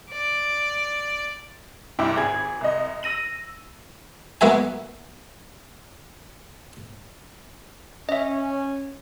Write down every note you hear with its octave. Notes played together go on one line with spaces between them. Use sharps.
D5
C2 G2 E4 G5 D6
G#1 G#4 G#5 B5 G#6
C2 D#5
E6 A#6 D#7 F#7
A#3 B3 F#4 E5 G#5
C#4 D#5 E5